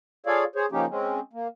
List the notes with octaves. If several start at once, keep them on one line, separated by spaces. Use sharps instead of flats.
F4 G#4 A4 C#5 D5 F5
G#4 C5 C#5
C#3 F3 A#3 C#4 D#4 G4
G#3 C4 C#4
A#3